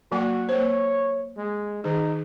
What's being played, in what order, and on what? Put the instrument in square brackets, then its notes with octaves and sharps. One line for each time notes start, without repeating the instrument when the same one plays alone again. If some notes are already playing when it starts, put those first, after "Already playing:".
[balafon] F#3 A#3 G#5 [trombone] F#4
[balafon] A#3 C5 [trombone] C#5
[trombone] G#3
[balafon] D#3 G#4 [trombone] D#4